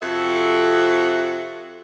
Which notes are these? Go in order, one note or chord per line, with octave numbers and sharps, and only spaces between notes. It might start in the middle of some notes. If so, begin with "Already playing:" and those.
F2 C3 F#4 A4 E5